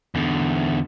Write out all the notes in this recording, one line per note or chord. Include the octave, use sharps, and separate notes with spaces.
E2 D3